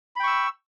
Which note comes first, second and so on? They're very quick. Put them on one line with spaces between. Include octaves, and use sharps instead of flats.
B5 G5 C#6 E6